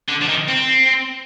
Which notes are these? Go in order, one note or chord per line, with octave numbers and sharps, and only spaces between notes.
D3
F3
D#3
C4